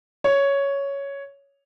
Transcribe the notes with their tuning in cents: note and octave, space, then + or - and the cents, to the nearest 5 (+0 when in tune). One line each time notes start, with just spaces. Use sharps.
C#5 +5